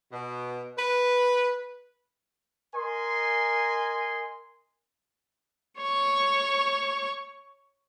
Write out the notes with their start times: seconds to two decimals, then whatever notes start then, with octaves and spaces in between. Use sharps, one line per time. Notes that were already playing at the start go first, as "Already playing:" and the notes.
0.11 B2
0.77 B4
2.74 A#4 D#5 G#5 C6
5.80 C#5 C#6